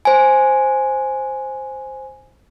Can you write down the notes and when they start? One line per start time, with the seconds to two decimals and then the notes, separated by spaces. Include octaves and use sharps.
0.05 C5 G#5